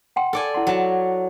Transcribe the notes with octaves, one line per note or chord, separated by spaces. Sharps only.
F#5 G5 C6
A4 D5 G#5
E4 F#5 C6
F#3 A5